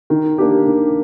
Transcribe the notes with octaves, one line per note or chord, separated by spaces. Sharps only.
D#3
A#3 D4 G4
D#3